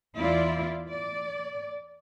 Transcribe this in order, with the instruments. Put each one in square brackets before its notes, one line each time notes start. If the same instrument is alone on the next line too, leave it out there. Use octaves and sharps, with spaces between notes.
[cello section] E2 E4 F4 D5
D5